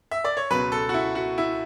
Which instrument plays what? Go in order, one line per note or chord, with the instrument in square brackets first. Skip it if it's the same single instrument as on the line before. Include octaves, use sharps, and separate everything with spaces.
[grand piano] E5
D5
C#5
C#2 B2 F#3 B4
A4
F#4
E4
F#4
E4